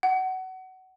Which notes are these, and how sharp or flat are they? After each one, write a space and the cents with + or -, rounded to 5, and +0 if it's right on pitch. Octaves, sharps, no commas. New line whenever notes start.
F#5 +20